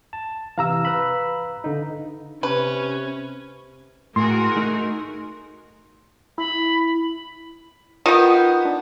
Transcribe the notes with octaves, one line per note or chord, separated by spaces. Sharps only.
A5
C3 E3 F5 A#5 E6
B4 B5
D3 D#4
C3 C#4 B4
A2 F#4 G#4 A#4 C6
A3 D#4
E4 B5
D#3 B3 F4 G6
D4